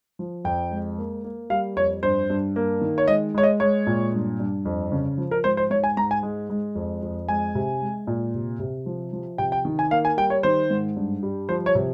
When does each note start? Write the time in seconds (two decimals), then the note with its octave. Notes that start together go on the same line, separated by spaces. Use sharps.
0.19 F3
0.45 F2 G5
0.71 G#3
0.98 A#3
1.24 A#3
1.50 G3 F5
1.77 F2 C#5
2.03 G2 C5
2.30 G2
2.56 A#3
2.81 D#3
2.98 C#5
3.08 G#3 D#5
3.34 G#3 C#5
3.43 D#5
3.60 G#3 C#5
3.87 A#2
4.13 G2
4.39 G2
4.65 F2
4.92 C#3
5.18 F3
5.31 A#4
5.44 G#2 C5
5.57 C5
5.70 G#2 C#5
5.84 G#5
5.97 G#2 A#5
6.11 G#5
6.23 G#3
6.50 G#3
6.75 F2
7.03 F2
7.29 G#3 G#5
7.55 C3
7.81 G#3
8.07 A#2
8.34 C3
8.59 C3
8.86 F3
9.13 F3
9.38 C3 G5
9.52 G5
9.65 D#3
9.79 G#5
9.91 A#3 F5
10.05 G#5
10.17 G3 G5
10.30 C#5
10.43 D#3 C5
10.70 G#2
10.96 G2
11.23 G3
11.49 F3 C5
11.66 C#5
11.75 C3